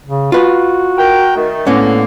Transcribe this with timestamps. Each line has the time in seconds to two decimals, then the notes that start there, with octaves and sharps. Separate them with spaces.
0.06 C#3
0.32 F4 F#4 B4
0.98 A#4 G5
1.36 D#3 A3
1.67 A2 D3 A#3 B3 C#4